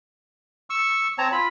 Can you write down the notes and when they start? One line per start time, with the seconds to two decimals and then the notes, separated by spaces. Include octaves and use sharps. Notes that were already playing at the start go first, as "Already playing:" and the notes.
0.70 C#6 E6
1.18 C4 C#5 A5 A#5
1.32 F4 B5